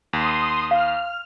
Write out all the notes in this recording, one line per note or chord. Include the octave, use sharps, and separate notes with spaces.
D#2 C6 D#6
F5 F6